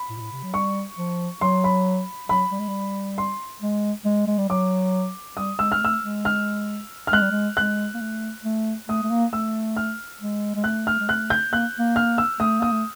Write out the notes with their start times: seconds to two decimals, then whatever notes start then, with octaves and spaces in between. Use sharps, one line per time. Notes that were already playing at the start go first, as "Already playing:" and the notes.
Already playing: B5
0.10 A2
0.17 A#2
0.21 A2
0.33 C3
0.43 F#3
0.54 G3 C#6
0.98 F3
1.41 F#3 C6
1.64 B5
2.29 F#3 B5
2.52 G3
2.60 G#3
2.68 G3
3.18 C6
3.62 G#3
4.05 G#3
4.27 G#3
4.38 G3
4.49 F#3 D6
5.37 G3 D#6
5.59 G#3 E6
5.72 G#3 F6
5.81 A3 E6
6.04 G#3
6.25 F6
7.07 F6
7.12 G#3 F#6
7.22 G3
7.31 G#3
7.57 G#3 F#6
7.95 A#3
8.01 A3
8.44 A3
8.89 A3 D#6
9.03 A3
9.10 A#3
9.32 A3 E6
9.77 F6
10.21 G#3
10.56 G#3
10.64 A3 F#6
10.87 F6
11.00 G#3
11.08 A3 F#6
11.30 G6
11.52 A#3 F#6
11.79 A#3
11.96 F6
12.18 E6
12.40 A3 D#6
12.60 A#3 D#6
12.72 A3